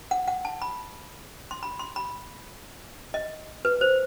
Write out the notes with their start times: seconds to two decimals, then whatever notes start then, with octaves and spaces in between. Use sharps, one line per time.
0.11 F#5
0.28 F#5
0.45 A5
0.62 B5
1.51 C6
1.63 B5
1.79 C6
1.96 B5
3.14 D#5
3.65 B4
3.81 C5